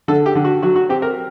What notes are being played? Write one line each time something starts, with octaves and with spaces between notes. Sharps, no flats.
D3 A4
G4
D3
F#4
F#3 F#4
F#4
C4 G4
A#4